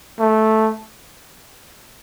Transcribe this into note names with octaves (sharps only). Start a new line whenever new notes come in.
A3